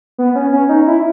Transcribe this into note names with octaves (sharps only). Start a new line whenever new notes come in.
B3
C#4
C#4
D#4
E4